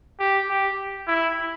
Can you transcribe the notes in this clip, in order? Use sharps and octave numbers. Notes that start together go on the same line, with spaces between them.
G4
G4
E4